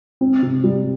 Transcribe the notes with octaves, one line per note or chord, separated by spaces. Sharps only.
C4
C3
G3